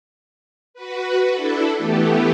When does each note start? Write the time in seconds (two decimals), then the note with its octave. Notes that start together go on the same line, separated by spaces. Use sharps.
0.74 F#4 B4
1.31 D4 E4 A4
1.77 E3 A3 B3 G4